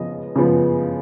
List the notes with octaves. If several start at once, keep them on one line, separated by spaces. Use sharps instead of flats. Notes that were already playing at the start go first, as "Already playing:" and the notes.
Already playing: C#3 F3 B3 D#5
C#3 F3 B3